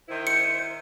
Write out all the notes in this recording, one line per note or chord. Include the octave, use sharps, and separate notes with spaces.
D#3 E4 C5
C#7